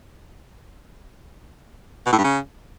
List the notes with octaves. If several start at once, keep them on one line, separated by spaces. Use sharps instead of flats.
B2
A2
G2
C#3